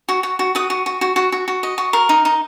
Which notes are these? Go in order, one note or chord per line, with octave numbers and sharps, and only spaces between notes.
F#4
F#4
F#4
F#4 D#6
F#4
F#4
F#4
F#4
F#4
F#4
D#5
F#4
A#4
D#4
D#4